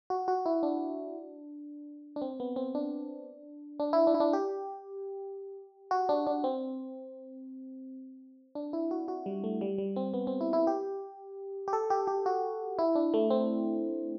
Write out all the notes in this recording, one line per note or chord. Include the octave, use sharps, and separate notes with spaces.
F#4
F#4
E4
D4
D4
C4
B3
C4
D4
D4
E4
D4
E4
D4
G4
F#4
D4
D4
C4
D4
E4
F#4
F#4
G3
A3
G3
G3
C4
B3
C4
E4
E4
G4
G4
A4
G4
G4
F#4
E4
D4
A3
C4